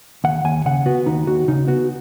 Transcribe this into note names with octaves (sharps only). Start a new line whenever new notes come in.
D#2 F#5
D#2 G#5
C#3 F#5
B3 F#4
D#2 D#4
D#2 F#4
C#3 D#4
B3 F#4